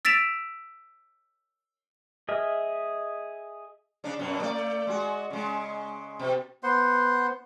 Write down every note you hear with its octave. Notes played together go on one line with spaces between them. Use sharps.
E6 A6 B6 D7 E7 F7
G#4 D#5 E5 F6
C#3 D4
F#2 B2 F#3
A3 D5
G#3 F#4
C#3 G#3
B2
B3 C5 F#5 C6